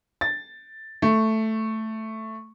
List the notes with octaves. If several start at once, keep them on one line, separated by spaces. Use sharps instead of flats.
A6
A3